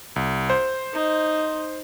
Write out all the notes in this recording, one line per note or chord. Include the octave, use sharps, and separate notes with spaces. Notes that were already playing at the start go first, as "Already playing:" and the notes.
C2
C5
D#4